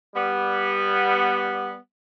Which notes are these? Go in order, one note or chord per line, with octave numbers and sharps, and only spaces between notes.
G3 B3